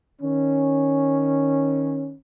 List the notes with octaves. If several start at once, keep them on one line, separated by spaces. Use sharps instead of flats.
D#3 C#4